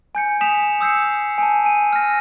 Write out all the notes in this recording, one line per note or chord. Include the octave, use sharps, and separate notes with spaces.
G#5 G6 C#7
G#5 D#6 B6 E7 F7
D#6 E6 G6 C7 C#7
G#5 A5
G#5 D#7
F6 A#6